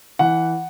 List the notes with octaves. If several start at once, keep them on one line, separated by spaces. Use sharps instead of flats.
E3 F#5